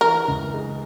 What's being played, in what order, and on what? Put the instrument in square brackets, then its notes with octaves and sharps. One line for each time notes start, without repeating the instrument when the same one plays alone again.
[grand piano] E3 [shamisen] A#4
[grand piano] C#2
G#3